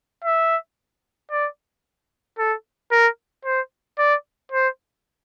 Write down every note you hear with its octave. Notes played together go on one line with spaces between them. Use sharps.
E5
D5
A4
A#4
C5
D5
C5